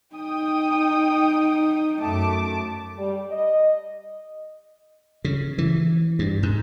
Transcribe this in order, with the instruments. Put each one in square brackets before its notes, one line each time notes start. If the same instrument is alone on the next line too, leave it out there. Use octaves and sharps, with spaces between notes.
[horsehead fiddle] D#4 [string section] G5 D#6
[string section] F#2 A5 D6 [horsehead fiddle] A3
[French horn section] G3
D#5
[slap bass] C#3
E3
G2
G#2